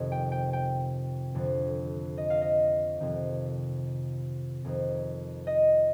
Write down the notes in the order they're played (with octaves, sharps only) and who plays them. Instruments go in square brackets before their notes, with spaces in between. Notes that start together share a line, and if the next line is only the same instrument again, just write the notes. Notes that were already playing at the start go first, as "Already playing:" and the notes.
Already playing: [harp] F2 C3 D#3
G5
G5
G5
F2 D3
D#5
F5
D#5
F2 C3 D#3
F2 D#3
D#5